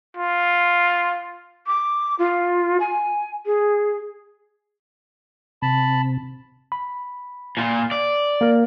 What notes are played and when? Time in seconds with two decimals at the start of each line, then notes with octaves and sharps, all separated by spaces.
0.17 F4
1.67 D6
2.19 F4
2.80 G#5
3.46 G#4
5.62 C3 A5 B5
6.72 B5
7.57 A#2 F4
7.91 D5
8.41 A#3 A#4